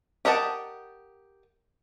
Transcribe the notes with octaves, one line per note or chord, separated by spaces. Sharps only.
G4 A#4 D#5 F#5 A5